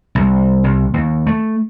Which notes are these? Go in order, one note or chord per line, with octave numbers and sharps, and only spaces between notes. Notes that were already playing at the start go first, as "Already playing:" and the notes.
C2
C2
D#2
A3